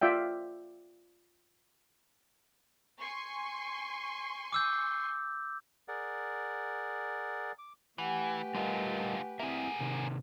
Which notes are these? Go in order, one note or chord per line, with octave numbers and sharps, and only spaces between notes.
F4 D5 E5 G5
G#5 C6 C#6
D6 E6 G6
G#4 A#4 D5 F#5
D6
E3 A3 G4 B4 F#5 G#5
D3 G3 F4 A#4 D#5
A#3 C4 E4 G#4 E5
C3 D#3